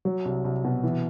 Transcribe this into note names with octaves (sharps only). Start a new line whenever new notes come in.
F#3
C2
C2
B2
E3